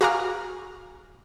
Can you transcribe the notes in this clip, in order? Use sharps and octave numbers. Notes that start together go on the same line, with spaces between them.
F#4 G#4 F5 A#5 D6 F6